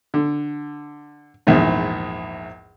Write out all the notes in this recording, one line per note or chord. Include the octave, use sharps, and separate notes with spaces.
D3
A#1 E2 G#2